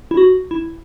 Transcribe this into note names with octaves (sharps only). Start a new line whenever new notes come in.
E4
F#4
E4